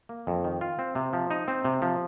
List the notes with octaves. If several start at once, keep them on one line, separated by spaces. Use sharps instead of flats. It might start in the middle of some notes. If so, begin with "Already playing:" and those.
A#3
F2
D#3
F4
C4
C3
F3
D#4
C4
C3
F3